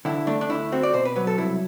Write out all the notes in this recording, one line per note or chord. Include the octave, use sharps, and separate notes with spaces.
D3 E4
A3 D4
D4
D2 E4
C4 F#4
D5
B2 C5
B4
F#3 B4
A4
C2 E4